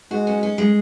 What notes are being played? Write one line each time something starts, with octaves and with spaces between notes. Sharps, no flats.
G#3 F#4
C#4
C#4
G#3